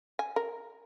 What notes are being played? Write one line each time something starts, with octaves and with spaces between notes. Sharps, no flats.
G#5
A#4